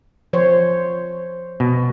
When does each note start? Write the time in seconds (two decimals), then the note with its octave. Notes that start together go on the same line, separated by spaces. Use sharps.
0.33 F3 C5 C#5
1.60 B2